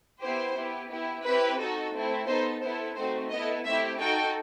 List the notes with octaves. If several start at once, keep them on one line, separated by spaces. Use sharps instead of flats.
B3 E4 G4 C5
B3 E4 G4
B3 E4 G4
C4 E4 G4 B4
D#4 F#4 A4
A3 C4 E4
B3 D#4 A4 C5
B3 E4 A4 C5
A3 C4 D#4 F#4 C5
B3 E4 A4 D#5
A3 C4 E4 G4 E5
D#4 F#4 A4 G5